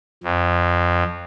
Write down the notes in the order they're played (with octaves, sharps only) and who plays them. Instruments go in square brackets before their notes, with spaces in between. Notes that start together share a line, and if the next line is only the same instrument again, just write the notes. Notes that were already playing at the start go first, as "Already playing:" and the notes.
[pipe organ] F2